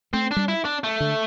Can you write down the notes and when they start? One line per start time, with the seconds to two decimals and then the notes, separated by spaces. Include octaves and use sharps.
0.13 A3 C4
0.31 D4
0.37 G3
0.48 E4
0.65 D4
0.84 A3
1.00 D3